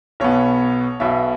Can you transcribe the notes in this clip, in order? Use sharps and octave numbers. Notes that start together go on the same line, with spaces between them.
B1 B2 B3 C#5
B1 B2 B3 E5